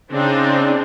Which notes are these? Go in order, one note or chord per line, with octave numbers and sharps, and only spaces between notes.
C#3 C4 D4 D#4